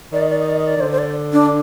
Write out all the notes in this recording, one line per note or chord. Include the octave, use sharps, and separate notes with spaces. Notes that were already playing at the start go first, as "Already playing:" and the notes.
D#3 D5
D#5
D5
D#5
D5
D#5
D5
D#3
D3 C5
C5
D5
D4